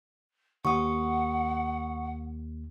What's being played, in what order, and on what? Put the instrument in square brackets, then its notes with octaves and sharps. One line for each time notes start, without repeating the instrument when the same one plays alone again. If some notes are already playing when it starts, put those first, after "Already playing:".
[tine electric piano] D#2 [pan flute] F#5 [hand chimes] C#6 D#6